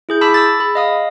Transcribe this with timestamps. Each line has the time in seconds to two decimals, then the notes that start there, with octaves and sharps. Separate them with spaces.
0.09 E4 G#4 G6
0.21 A5 B5 D6 E6 B6
0.34 E6 A6
0.60 G#4 B5
0.75 D#5 F5 D#6